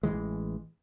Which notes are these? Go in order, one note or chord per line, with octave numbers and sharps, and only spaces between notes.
A1 D#3 E3 G#3